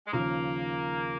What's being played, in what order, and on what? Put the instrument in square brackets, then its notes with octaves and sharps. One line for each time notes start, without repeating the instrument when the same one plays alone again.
[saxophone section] G#3
[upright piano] D#2 C#3 F3 [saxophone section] A#3